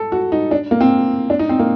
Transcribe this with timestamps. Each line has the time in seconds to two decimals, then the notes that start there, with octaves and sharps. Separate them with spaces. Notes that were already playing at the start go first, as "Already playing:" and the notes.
Already playing: A4
0.12 F#4
0.32 D#4
0.51 D4
0.71 A#3
0.81 C4
1.30 D4
1.39 D#4
1.49 C4
1.59 A#3